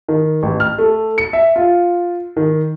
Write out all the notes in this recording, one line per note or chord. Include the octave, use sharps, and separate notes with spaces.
D#3
A1
F6
A3
C#7
E5
F4
D#3